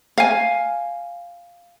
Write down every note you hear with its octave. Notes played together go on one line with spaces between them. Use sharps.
F5 G#5